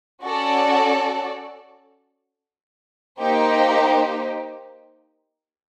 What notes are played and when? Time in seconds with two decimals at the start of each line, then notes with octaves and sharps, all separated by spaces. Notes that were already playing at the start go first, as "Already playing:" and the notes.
0.24 C#4 F#4 A4 D5
3.21 A#3 D#4 G4 C5